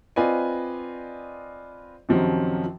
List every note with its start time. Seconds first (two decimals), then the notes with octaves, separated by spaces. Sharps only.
0.16 C4 F4 B4 D5 D#5 G#5
2.09 F#2 C3 D#3 F3 F#3